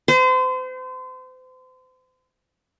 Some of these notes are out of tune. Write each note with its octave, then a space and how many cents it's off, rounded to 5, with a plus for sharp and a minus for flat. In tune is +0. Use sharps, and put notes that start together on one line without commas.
C5 -35